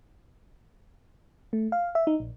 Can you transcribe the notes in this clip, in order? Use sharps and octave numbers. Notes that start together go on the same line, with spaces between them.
A3
F5
E5
D#4
A#1